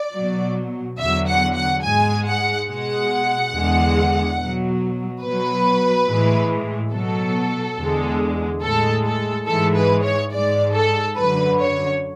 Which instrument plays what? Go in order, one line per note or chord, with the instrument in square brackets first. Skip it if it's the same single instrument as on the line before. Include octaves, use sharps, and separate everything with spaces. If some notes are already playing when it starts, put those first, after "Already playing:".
Already playing: [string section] D5
B2 F#3
E2 D3 F#3 E5
F#5
F#5
G#2 G#3 G#5
F#5
B2 G#3 F#5
E2 D3 G#3
B2 F#3
B2 F#3 B4
A2 E3 G#3
B2 F#3 A4
E2 D3 G#3
A2 G#3 A4
A4
G#2 E3 G#3 A4
B4
C#5
G#2 G#3 D5
A4
F#2 D3 F#3 B4
C#5